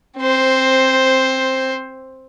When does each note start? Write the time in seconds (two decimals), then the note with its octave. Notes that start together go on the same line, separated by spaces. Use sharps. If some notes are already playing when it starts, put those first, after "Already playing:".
0.18 C4 C5